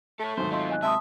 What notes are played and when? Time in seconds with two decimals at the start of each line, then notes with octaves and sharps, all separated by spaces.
0.20 A3 A4 C#5
0.37 D#2 G#2 F#3 C5
0.52 C4 F4 D#5 C6
0.69 D#5 G#5 F#6
0.83 G#2 C3 E5 A5 C6 D#6